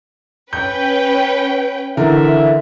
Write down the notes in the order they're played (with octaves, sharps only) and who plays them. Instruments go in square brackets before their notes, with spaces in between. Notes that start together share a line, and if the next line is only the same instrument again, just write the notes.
[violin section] C#4 B4 G5 [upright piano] G6
[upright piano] D3 E3 A#4 [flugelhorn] E5